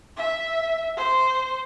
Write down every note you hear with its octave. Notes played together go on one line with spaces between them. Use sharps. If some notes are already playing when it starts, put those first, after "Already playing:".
E5
C5